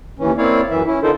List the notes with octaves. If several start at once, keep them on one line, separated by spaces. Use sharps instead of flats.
D#2 E3 C#4
A#3 C4 E4 C#5 D5 F5
F#2 E3 E5
C#4 E4
D3 D#4 F4 A4 A#4 C5